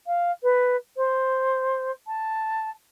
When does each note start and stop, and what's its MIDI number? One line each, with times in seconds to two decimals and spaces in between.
0.06 0.31 77
0.43 0.76 71
0.96 1.91 72
2.07 2.70 81